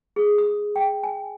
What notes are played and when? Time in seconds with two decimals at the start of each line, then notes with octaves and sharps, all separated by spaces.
0.16 G#4
0.38 D#6
0.76 G5
1.03 G#5